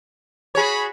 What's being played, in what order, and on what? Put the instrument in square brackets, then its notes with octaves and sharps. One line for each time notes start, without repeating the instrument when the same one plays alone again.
[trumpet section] F#4 B5 [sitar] G#4 C#5